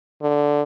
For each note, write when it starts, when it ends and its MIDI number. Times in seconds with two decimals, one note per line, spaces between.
0.22 0.62 50